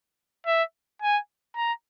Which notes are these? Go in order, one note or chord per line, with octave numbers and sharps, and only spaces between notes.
E5
G#5
A#5